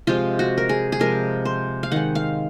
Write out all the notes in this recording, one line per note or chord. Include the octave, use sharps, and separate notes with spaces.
C3 F3 G#3 F4
F#4
A#4
G#4
G#4
C3 F3 G#3 A#4
C5
F5
D#3 G#3 F#5
F5